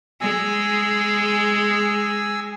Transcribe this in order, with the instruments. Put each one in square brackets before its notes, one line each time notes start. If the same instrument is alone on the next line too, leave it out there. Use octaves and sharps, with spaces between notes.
[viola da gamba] G#3 [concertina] G#5 E6